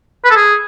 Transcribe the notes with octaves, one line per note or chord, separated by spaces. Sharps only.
B4
A4
G#4